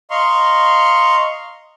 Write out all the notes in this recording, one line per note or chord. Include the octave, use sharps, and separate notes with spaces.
D#5 F5 A#5 C6 C#6